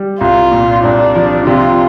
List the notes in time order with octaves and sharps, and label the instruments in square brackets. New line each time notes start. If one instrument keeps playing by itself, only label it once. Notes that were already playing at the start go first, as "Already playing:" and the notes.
Already playing: [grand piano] G3
[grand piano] C2 [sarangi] F4
[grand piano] A#2
[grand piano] C2 [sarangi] D4
[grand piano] F3
[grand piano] C3 [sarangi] F4